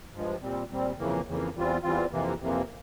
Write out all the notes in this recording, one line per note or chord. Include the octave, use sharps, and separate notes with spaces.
G2 F3 G#3
A#2 G3 C4
A#2 G3 C4
F2 C#3 E3 A#3
F2 C#3 E3 A#3
E2 E3 G3 C4 F4
E2 E3 G3 C4 F4
F2 C3 E3 A#3
F2 C3 E3 A#3